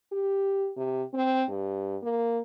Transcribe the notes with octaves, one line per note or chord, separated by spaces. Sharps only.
G4
C3
C4
G2
A#3